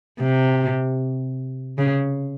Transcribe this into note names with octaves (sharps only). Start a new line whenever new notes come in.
C3
C#3